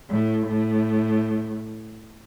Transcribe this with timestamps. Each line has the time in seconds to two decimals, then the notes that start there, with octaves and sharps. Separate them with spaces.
0.10 A2
0.47 A2